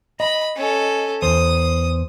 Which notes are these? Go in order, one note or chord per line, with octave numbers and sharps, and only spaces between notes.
D#5 B5
C#4 A4
E2 C5 D#6